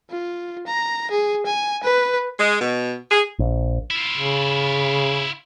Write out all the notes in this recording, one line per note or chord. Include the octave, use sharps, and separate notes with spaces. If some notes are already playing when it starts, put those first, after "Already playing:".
F4
A#5
G#4
G#5
B4
G#3
B2
G#4
A#1
E4 F4
C#3